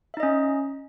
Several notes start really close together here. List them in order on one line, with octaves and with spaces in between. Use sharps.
E5 D#4 D#5 C#4